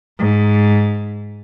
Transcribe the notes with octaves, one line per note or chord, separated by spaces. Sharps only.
G#2